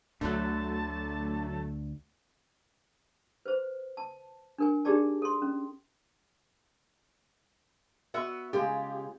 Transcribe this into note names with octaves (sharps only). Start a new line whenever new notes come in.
D2 D3 F#3 A3 A5 F#6
B4 C5
A5
D4 A#4 G#5
D4 D#4 G4 G#4 D5 A5
A4 C6
C#4
B3 F#4 E5
C#3 G#3 F4 G4